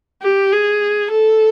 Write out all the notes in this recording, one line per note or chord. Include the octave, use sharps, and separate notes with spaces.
G4
G#4
A4